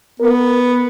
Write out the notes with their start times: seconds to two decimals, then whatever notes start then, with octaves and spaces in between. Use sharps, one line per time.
0.20 B3 A#4